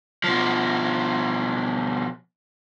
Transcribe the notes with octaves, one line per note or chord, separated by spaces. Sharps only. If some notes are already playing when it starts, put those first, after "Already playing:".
B2 F3